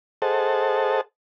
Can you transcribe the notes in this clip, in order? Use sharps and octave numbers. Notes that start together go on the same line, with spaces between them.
G#4 A4 C5 D#5 F#5 A5